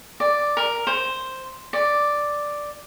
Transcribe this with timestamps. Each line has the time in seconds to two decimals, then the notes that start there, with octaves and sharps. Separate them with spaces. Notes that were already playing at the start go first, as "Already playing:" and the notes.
0.20 D5
0.57 A#4
0.87 C5
1.73 D5